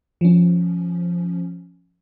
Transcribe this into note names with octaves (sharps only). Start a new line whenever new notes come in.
F3 C#4